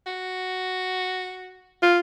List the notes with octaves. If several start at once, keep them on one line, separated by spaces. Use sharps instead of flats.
F#4
F4